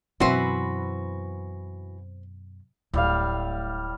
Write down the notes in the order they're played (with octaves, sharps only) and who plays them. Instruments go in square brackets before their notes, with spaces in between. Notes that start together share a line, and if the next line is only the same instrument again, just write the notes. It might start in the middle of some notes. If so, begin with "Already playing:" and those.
[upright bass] F#2 B2 [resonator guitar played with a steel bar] E3 F#4 B4 [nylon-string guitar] C4 C5
[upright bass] D1 [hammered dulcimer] A2 G3 F5